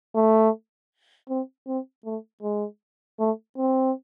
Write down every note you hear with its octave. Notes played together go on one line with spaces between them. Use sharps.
A3
C4
C4
A3
G#3
A3
C4